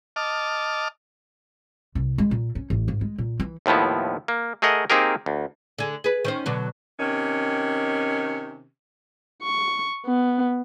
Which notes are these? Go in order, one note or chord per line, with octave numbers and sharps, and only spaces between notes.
D#5 A5 D6 F6
C2
G#3
A#2
C#4
A1
G#2
G#3
A#2
E3
D#2 A2 F3 B3 E4
A#3
A3 G#4 A#4 D#5 F#5
A#3 C4 D#4 G4 G#4 A#4
D2
D3 G#4
G#4 B4
D#3 C#4 C5
B2 D3 F#3
C3 D#3 C#4
C#6
B3